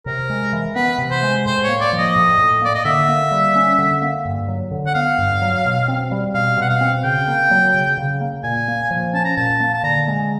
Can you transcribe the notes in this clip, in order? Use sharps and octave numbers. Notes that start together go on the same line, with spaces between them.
C3 A#4
G#3
E3
B3 B4
C3
C5
G#3
A2 C5
C#5
A#3
D5
F3
D#5
A2
A2
A#3 D5
D#5
D3 E5
A#3
G3
C#4
D3
A#3
G2
F#3
D3
F#5
B3 F5
G2
F#3
B2
C4
G3
B2 F5
B2 F#5
F5
C4
C#3 G5
A#3
F#3
C#3
C#3
A#3
A#2 G#5
A#3
F3
C#4 A5
A#5
A#2 A5
A#3
A5
D3 A#5
G#3